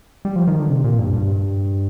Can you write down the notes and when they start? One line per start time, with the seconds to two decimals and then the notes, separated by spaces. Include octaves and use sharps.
0.25 G3
0.36 F3
0.47 D#3
0.59 D3
0.69 C3
0.84 A#2
0.99 G2
1.14 G2